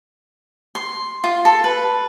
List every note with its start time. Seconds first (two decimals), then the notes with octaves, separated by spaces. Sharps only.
0.75 C6
1.24 F4
1.45 A4
1.64 B4